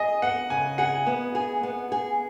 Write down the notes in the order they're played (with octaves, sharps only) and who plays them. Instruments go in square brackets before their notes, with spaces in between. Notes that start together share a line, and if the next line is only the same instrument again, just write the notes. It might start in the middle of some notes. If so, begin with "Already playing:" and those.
Already playing: [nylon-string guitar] G#4 [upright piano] D#5
[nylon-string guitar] B3 [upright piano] F#5
[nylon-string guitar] C#3 [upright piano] G#5
[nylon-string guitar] G#4 [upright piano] F#5
[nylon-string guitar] B3
G#4
B3
G#4